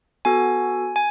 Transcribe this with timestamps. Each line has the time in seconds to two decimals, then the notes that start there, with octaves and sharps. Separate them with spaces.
0.25 B3 F#4 A4 G#5
0.96 G#5